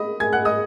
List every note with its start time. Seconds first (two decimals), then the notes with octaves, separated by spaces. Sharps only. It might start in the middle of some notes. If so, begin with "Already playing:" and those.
Already playing: D#5 B5 D#6
0.20 G#5 G#6
0.33 F#5 F#6
0.45 D#5 D#6